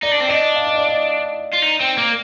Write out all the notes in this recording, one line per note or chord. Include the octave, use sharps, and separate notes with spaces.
D#4 D5
D4
C4
D4 D#5
F5
D#5
D5
D#5
F4
D#4
C4
A#3